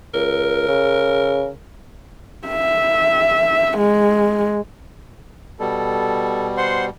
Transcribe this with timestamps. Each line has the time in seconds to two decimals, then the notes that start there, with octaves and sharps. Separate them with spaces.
0.14 C#2 A#4
0.67 C#3
2.48 E5
3.78 G#3
5.60 B2 G3 A4
6.57 C5 F#5 C6